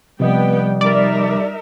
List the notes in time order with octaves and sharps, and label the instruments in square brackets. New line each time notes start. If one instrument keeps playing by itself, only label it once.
[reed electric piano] C3 F3 D#5 [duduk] G3 [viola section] B3 G5
[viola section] D#4 A#4 E5 [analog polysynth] D5